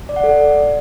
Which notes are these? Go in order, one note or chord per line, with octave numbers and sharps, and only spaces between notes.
D5
F#5
A4
D5